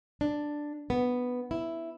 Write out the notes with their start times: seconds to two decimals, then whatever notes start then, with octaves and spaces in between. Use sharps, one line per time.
0.21 D4
0.90 B3
1.51 E4